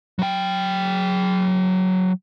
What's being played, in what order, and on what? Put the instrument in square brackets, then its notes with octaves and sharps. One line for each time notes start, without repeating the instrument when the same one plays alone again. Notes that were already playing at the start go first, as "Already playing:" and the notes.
[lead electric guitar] F#3 G5